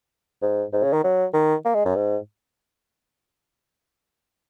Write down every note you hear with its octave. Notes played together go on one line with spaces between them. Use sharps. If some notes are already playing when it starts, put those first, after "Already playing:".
G#2
G#2
C#3
D#3
F#3
D#3
A#3
G#3
F#2
G#2